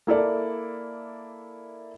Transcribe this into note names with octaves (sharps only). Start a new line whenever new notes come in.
A#3 E4 A4 D5